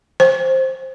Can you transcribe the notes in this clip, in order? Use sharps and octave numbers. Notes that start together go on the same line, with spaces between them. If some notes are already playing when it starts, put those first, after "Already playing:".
C5